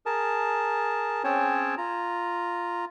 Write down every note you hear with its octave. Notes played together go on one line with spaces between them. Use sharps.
G#4 A#4 A5
C4 C#4 G#4 C#5 G5 A5
F4 A#5